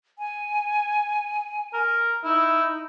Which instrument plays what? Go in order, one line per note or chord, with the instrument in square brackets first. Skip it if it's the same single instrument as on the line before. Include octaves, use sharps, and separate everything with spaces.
[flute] G#5
[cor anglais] A#4
[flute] D#4 [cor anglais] E4